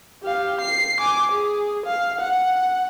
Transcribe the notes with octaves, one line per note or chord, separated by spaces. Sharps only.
G4 F5
C7
G#5 D6
G#4
F5
F#5